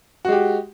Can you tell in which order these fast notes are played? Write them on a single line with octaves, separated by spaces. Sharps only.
F#4 G#3 G4